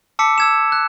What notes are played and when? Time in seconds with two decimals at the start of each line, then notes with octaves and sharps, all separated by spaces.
0.19 A5 D6 E6 B6 C#7
0.38 E6 G#6 E7
0.72 F#6